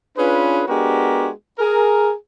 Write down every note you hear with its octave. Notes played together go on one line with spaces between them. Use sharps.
C#4 D4 F4 G#4 B4
G#3 B3 D4 F#4 G4 A#4
G#4 A#4